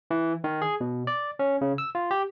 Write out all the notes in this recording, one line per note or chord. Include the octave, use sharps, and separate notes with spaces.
E3
D#3
G#4
B2
D5
C#4
C#3
E6
F4
G4